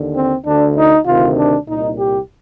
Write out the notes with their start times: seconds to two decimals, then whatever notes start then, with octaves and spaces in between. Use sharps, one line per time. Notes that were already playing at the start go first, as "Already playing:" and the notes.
Already playing: D#2 D3
0.14 C4
0.45 D2 D3 D4
0.76 D#4
1.07 D2 C3 D#3 F4
1.37 D4
1.68 C2 A#2 D#4
1.98 G4